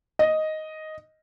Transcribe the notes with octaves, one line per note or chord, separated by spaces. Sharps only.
D#5